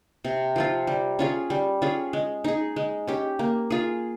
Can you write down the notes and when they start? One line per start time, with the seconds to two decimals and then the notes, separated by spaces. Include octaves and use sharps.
0.24 C3
0.56 F3 C4 F4
0.87 G3
1.19 C#4 F4 G#4
1.50 G3
1.82 C#4 F4 G#4
2.13 G#3
2.44 D#4 G#4
2.76 G#3
3.07 C#4 G4
3.39 A#3
3.70 F4 G#4